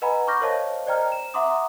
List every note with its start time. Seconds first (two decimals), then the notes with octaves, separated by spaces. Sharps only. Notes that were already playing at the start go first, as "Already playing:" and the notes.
0.02 B4 D#5 F#5 G#5 A#5 B5
0.27 C#6 D6 F6 G6 A#6
0.41 A#4 C5 C#5 D#5 F5 A5
0.86 C5 D5 D#5 G5 A#5 F6
1.12 E7
1.34 E5 F#5 A#5 C6 D6 D#6